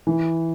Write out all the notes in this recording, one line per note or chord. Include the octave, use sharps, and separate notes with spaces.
E3